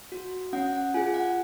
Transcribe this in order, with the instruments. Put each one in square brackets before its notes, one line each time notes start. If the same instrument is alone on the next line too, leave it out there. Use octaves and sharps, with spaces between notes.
[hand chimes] F#4
C#4 F#5
F#5
F4 G#4 G#5
F#5